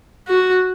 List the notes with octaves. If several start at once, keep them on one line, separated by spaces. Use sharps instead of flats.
F#4